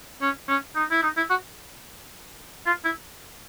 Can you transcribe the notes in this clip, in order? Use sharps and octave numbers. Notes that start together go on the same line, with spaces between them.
C#4
C#4
D#4
E4
D#4
E4
F#4
F4
E4